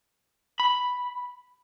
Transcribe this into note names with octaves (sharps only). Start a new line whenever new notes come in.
B5